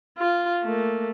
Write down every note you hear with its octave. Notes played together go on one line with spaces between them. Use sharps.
F4
A3 A#3